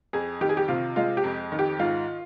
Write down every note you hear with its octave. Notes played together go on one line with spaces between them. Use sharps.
F2 G#4
D#3 G4
G#4
G4
C3 F4
G#3 F4
G4
F2
D#3
G4
G#2 F4